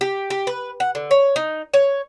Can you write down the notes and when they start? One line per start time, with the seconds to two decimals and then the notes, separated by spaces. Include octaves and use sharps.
0.01 G4
0.30 G4
0.47 B4
0.80 F#5
0.95 D3
1.11 C#5
1.36 D#4
1.74 C#5